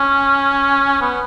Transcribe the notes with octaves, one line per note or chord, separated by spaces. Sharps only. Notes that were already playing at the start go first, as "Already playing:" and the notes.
Already playing: C#4
B3